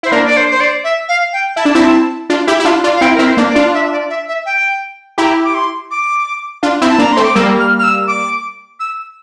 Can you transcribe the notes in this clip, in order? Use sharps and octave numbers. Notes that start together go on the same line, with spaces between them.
E4 C5
A#3 D4 A#4
D5
C5
C5
D5
E5
F5
G5
E4 A5
D4
C4 E4
D4 F4
E4 G4
E4
D4 F4
D4 F4
F5
C4 E4 G5
C4 E4 A#4
C5
A#3 D4
D5
D4 F4
E5
D5
E5
E5
G5
E4 G4 A#5
D6
C6
D6
D4 F4
C4 E4
A5
A#3 D4 A#5
A3 C4 C6
D6
G3 A#3 E6
F6
F6
E6
D6
E6